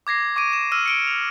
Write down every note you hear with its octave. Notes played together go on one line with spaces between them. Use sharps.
D6 G#6 A#6 C7
C#6 D6 D7 D#7
E7
E6 F6 D#7
C#7 D7 G7
F7